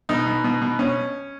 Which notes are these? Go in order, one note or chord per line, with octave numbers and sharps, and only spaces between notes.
B2 D#4
B2
B2
B2
B2 C#4